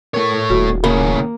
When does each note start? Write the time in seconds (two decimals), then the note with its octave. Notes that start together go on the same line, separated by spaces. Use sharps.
0.14 A3 A#4 C#5
0.50 D#1 F#4
0.84 A2 C#3 A#3 B5